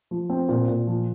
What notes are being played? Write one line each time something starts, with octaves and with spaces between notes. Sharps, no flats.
F3
C4
A#2
A#2
F3